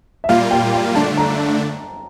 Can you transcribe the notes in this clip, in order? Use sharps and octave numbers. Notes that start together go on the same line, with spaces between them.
E5
A#2 G3 A#3 F4 F5
G5
G5
D3 A3 D4 A5
A#5